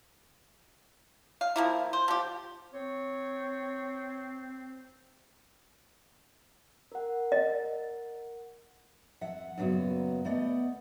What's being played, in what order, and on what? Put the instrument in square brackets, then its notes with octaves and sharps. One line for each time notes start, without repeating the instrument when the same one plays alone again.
[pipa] F5
F3 A#3 E4
C5
F3 G4
[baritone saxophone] C4 [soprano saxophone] C#5
[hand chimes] A#4 F#5
[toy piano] D#5
[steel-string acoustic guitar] F2 E5 F#5
F#2 A#2 C#3 B3 F#4
A3 B3 D5 D#5 F#5